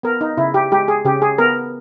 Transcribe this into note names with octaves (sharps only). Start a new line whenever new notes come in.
B3 A#4
D#4
C#3 E4
G4
G#3 G4
G#4
C#3 G4
G#4
B3 A#4